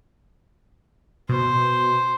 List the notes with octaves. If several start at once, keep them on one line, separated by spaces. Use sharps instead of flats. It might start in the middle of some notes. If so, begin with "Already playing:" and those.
B2 C5